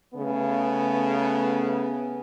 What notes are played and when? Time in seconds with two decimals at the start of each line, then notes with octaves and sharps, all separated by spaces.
0.15 C#3 A3 B3